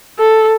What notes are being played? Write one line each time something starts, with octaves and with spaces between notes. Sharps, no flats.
A4